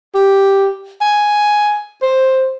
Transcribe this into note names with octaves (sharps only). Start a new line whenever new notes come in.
G4
G#5
C5